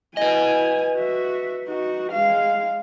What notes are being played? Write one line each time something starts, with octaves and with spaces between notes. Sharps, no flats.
E4 B4 D#5 G#5
F#4 E5
D#4 F#4
G#3 F5